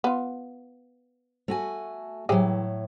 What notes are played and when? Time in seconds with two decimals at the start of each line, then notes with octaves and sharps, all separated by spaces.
0.04 B3 F4
1.48 A3 F#4 G#5
2.29 A2 E3 F#3 G4 G#4